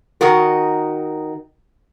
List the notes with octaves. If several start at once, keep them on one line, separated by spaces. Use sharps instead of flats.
D#3 D#4 F#4 A#4